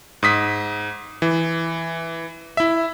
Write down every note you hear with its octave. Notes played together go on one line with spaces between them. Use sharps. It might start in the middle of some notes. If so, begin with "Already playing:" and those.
G#2 D#6 B6
E3
E4 E5